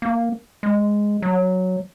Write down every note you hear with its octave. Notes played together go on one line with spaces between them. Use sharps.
A#3
G#3
F#3